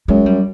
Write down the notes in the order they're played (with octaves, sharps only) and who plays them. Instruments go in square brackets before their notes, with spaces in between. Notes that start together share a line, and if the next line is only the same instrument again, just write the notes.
[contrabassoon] F#2 [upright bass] G#3
[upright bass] G3